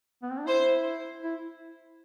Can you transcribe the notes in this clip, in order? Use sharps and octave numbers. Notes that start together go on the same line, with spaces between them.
B3
C4
D4
E4 C5
E4